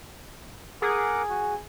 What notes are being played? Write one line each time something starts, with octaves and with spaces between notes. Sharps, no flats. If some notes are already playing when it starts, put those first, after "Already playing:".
G#4 A#4 F#5 D6
F#4